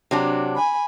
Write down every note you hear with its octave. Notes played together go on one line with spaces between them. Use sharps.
C3 F#3 D4
G#5 B5